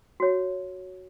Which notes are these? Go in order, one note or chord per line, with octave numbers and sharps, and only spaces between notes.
F#4 C#5